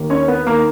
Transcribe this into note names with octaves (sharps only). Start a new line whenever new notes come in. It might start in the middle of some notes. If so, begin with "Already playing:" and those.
Already playing: D#2 D#3 A#3
C#4 C#5
B3 B4
D#3 A#3 A#4